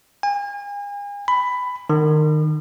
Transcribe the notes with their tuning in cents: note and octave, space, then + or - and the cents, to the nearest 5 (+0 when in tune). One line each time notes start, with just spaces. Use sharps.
G#5 -40
B5 +15
D#3 -25